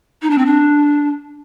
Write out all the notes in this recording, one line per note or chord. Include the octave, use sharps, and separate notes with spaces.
D#4
D4
C4
D4